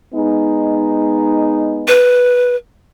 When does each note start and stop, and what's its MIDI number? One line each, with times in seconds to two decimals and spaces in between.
0.13 1.98 56
0.13 1.98 59
0.13 1.98 63
1.88 2.56 71